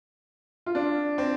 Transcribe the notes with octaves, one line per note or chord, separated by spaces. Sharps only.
F4
D4
C4